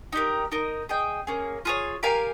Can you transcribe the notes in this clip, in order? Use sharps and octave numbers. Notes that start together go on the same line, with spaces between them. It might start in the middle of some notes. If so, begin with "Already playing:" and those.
D#4 G4 A#4
D#4 A#4 D#5
G#4 D#5 G5
A#3 C#4 G#4
F4 G#4 C#5
G4 A#4 F5 G#5